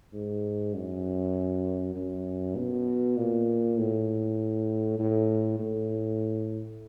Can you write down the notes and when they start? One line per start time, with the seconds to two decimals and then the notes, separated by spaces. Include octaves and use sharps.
0.14 G#2
0.74 F#2
1.95 F#2
2.56 B2
3.17 A#2
3.78 A2
4.99 A2
5.59 A2